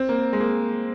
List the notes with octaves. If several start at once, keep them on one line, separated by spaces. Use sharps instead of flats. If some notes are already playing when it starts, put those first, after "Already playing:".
Already playing: C4
A#3
G#3
A#3